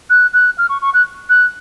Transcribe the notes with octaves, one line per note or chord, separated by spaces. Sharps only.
F#6
F#6
F6
C#6
C#6
F#6
F#6